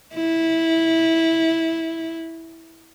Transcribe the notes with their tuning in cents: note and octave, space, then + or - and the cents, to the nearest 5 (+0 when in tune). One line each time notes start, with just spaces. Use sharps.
E4 -15